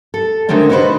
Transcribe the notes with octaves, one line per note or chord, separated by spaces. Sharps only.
A4
D3 D#3 A3 C4 C#4
D#4 E4 F#4 A4 B4 C5